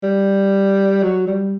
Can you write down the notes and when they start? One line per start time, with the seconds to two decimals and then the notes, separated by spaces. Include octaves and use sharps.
0.03 G3
1.03 F#3
1.27 G3